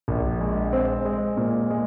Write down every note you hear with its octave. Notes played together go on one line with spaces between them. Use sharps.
A#1
G#3
C4
G#3
A#2
G#3